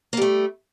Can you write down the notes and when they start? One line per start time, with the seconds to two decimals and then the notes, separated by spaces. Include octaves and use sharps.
0.13 A#3
0.17 G3
0.22 A3